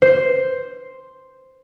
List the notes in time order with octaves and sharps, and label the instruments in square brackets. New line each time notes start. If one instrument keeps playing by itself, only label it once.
[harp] C5